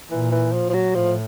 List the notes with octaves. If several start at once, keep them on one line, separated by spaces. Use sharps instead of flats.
A#2 E3
E3
F3
F3
F#3
A2 F3